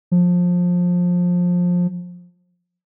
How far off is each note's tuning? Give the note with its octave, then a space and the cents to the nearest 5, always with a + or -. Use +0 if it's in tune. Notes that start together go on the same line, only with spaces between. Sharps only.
F3 +20